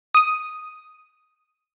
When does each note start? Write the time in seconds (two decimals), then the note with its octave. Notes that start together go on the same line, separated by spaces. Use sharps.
0.15 D#6 D#7